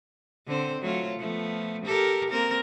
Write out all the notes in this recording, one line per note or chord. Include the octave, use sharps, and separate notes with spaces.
D3 C4 C5
F#3 A3 F4
F3 A3 B3
G4 A4 A#4
A#3 C4 A#4